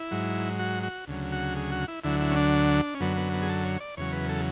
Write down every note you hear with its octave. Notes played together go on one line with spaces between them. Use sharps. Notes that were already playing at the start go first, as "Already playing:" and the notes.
Already playing: E4
G#2 F#3
F#4
F#4
D2 C#3 F#3
F#4
G#4
F#4
E4
D2 D3 F#3 E4
E4
C#4
D4
C#4
F#2 D3 F#3 B3
B3
B3
G#4
A4
C#5
D5
E2 C#3 F#3 C#5
B4
A4